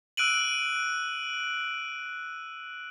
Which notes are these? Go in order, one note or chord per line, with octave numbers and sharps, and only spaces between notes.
E6 F#6 D7 D#7 F#7